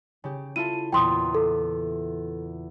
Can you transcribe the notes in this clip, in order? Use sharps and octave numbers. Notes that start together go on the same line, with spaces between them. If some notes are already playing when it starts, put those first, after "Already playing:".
C#3 G4
E4 F4 A4 D#7
E2 A#2 G5 C6 D#6
A4